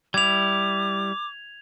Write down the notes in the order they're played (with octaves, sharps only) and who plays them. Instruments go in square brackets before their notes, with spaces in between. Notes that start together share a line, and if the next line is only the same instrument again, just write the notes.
[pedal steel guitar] G3 E4 [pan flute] D6 [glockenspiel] G#6 F7